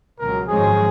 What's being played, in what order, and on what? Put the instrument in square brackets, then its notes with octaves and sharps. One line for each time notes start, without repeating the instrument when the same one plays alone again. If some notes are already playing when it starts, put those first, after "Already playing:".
[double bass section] C#2 B2 F#3 [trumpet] A#4
[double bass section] G#1 F#2 F3 G#3 C#4 [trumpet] G#4